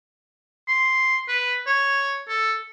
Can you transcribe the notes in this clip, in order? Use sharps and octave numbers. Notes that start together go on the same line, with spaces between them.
C6
B4
C#5
A4